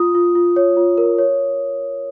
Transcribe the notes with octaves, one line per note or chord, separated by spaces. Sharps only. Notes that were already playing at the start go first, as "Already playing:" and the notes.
Already playing: F4 D#6
F4
F4
C#5
F4
A#4
C#5